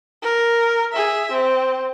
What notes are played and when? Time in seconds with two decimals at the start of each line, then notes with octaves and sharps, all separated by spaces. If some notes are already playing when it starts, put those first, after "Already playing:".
0.22 A#4
0.93 G#4 E5
1.31 C4